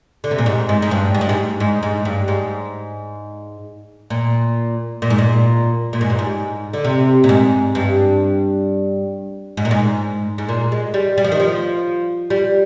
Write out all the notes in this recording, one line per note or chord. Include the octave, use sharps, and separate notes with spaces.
D3
C3
A#2
G#2
G#2
G#2
G2
G#2
G2
G#2
G#2
G#2
G2
G#2
A#2
A#2
G#2
A#2
A#2
G#2
G2
G#2
D3
C3
A#2
G#2
G2
G#2
A#2
G#2
G#2
A#2
G#3
G3
G3
F3
D#3
F3
G3